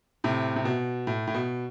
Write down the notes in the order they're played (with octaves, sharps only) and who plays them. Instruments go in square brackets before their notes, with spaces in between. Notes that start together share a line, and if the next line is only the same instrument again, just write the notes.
[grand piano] A2 C3
C3
B2
A2
A2
B2